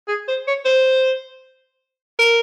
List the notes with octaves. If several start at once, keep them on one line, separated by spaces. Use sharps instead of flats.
G#4
C5
C#5
C5
A#4